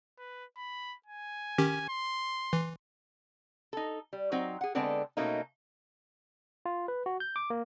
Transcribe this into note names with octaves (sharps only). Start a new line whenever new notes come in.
B4
B5
G#5
D#3 C#4 G4
C6
E3
D#4 A4
G3
F#3 C4 D#4 C5
G#4 F#5
D3 G#3 B3 C4 D4 A4
B2 A3 A#3 C#4 D#4
F4
B4
F#4
G6
D6
A#3